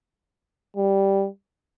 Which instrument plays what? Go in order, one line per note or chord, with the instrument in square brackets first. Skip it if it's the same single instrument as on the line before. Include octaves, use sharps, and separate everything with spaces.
[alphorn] G3